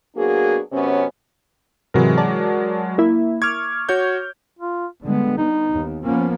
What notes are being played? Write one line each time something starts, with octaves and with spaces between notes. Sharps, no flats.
F#3 A#3 B3 D4 F#4 G#4
F#2 C3 B3 C#4
G#2 C3 E3 F#3 G#3 A#4
D5 A5
A#3 E4
C#6 D6 F6 G#6
F#4 C#5 G6
F4
D3 G3 G#3 B3
B3 D#4
D#2
F3 A#3 B3 C#4